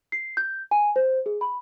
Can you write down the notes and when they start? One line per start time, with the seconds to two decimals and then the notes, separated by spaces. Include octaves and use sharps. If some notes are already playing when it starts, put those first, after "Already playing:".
0.12 C7
0.37 G6
0.71 G#5
0.96 C5
1.26 G#4
1.41 B5